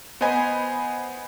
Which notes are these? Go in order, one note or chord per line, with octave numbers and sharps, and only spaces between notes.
B3 C5 D#5 G#5 B5